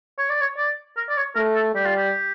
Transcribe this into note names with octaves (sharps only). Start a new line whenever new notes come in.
C#5
D5
C#5
D5
A#4
D5
C#5
A3 A#4
A4
G3 G4
F4
G4